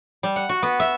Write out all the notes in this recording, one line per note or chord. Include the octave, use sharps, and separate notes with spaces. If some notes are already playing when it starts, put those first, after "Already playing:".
G3
F#5
F#4
B3
E5